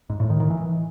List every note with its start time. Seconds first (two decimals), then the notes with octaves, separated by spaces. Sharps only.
0.10 G#2
0.20 A2
0.30 D#3
0.40 D#3
0.50 E3